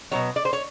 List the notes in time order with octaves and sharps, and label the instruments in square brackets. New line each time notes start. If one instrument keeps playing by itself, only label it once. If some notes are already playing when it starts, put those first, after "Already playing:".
[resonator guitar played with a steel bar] B2 F#3 B3 C#5
D5
C5
C#5